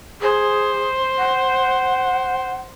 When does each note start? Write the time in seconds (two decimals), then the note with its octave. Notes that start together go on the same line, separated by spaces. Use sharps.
0.22 G#4 C5
1.18 F#5